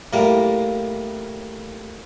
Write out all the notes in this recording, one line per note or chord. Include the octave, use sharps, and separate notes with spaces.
A2 G3 A#3